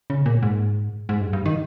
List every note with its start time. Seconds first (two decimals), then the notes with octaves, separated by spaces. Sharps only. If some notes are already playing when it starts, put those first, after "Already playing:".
0.10 C#3
0.26 A#2
0.43 G#2
1.09 G#2
1.21 G2
1.33 G2
1.46 D#3